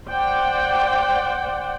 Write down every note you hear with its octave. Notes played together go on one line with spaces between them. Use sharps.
C5 D5 F#5 G5